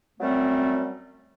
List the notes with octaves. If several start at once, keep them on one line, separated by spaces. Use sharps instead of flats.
F#2 F#3 G3 A3 C4